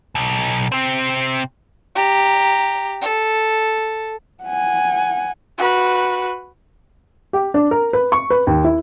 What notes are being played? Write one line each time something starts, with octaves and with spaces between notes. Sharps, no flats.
B1
C3 C4
G4 A#5
A4
F#5 G#5
F#4 B4
G4
D4
A#4
B4
C#6
B4
D#2
E4